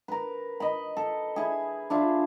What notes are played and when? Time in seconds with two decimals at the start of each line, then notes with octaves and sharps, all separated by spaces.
0.08 A#4 B4
0.60 D#5 B5
0.97 A4
1.36 E4 G#4
1.90 D4 E4 F4